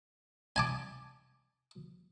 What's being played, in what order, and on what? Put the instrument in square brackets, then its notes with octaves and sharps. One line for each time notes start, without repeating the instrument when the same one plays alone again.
[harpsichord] G#5 A5 D6